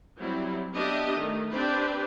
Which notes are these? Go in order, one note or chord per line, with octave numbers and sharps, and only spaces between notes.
F#3 G3 C4 E4
B3 D4 G4 D#5 E5
D#3 A3
C4 D4 G4 B4 C5 D5